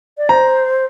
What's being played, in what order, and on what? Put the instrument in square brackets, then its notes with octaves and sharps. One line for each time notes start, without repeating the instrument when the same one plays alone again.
[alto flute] D5
[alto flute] C5 [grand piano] A#5